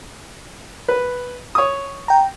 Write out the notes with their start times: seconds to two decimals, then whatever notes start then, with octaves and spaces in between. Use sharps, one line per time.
0.88 B4
1.55 C#5 D#6
2.08 G5 A#5